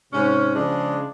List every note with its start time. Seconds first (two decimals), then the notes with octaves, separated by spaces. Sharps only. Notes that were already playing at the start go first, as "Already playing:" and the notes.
0.13 G#2 C3 C#4
0.55 C#3 F3 G#3 D4